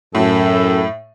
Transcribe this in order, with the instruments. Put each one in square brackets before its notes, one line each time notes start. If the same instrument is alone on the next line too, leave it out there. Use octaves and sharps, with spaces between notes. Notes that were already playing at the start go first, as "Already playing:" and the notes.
[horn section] F#2 A4 [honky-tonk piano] A2